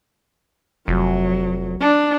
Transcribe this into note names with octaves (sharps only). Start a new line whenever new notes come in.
F1 F#3
D4